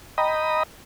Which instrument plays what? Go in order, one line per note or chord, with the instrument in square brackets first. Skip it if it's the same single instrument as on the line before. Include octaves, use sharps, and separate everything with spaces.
[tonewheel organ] D#5 G5 A#5 B5 D#6